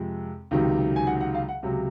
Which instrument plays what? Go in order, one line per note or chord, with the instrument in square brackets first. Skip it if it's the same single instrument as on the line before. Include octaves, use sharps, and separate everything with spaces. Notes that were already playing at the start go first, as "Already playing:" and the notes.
Already playing: [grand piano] F2 C3 F3 G#3
C#2 C3 D#3 F#3
G#5
F#5
F#5
F5
F#5
C#2 C3 F#3